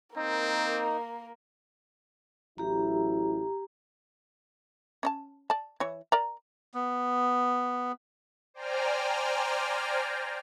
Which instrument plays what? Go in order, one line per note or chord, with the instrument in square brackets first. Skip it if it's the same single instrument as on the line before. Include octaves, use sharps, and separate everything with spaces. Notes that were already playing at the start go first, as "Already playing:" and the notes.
[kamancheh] A#3 A#4 [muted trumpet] C4 [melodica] D#4
[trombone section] A1 F#3 E4 [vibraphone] G4 A#5
[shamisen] C#4 D#5 A5
D5 A5
E3 E4 C#5
A#4 D5 A#5
[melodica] B3
[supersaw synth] C5 D5 G5 G#5 A#5 F6